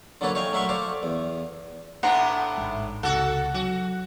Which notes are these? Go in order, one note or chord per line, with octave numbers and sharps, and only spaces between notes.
D3 F#3 A#3 A4 B4 C#5
C#5 D#5 F5 G5 G#5
F#3 A3 A#4 E5 C6 C#6
A4 C5 D5 F5
E2
A2 B3 D4 F#5 A#5 C6
A1 G#2
C#2 C3 F#4 A4 F#5
F#3 F#4